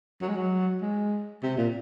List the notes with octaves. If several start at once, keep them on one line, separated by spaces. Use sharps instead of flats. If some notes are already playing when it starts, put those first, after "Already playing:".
F#3
G#3
F#3
G#3
C3
A#2